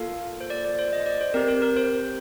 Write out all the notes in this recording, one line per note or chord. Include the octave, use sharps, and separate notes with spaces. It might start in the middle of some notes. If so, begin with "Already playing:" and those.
Already playing: A#3 F4 A4 F5
C5
D5
D5
C5
D#5
D5
C5
C4 G4 A#4
C5
A#4
C5